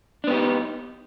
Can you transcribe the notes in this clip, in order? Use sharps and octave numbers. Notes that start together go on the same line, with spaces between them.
B3 D4 D#4 G4